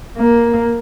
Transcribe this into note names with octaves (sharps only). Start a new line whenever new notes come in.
A#3